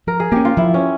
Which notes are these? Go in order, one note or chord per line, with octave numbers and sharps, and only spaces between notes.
F3 A#4
G#4
A#3 C#4 G4
F4
F3 E4
C#4